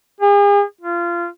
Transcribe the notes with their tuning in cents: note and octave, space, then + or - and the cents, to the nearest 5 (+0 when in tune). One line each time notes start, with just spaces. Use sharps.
G#4 -40
F4 -20